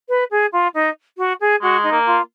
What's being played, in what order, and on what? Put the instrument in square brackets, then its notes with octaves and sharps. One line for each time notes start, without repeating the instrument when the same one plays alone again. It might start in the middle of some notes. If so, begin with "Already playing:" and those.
[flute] B4
G#4
F4
D#4
F#4
G#4
[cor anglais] G#3 [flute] F#4
[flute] D#4
[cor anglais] A#3
[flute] F4